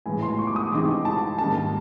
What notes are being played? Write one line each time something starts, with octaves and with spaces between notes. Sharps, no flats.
A2 E3 G#3 B3 G#5
C6
C#6
D6
D#6
E3 G#3 C4 D#4 G4 D6
A5
G#2 D#3 G3 A#3 C#4 A5